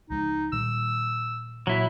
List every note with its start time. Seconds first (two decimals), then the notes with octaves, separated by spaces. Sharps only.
0.10 C#2 F3 G#3 D#4
0.53 A#2 D#3 G3 E6
1.67 A#2 F#3 E4